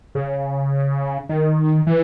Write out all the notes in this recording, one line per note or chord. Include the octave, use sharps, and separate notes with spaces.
C#3
D#3
E3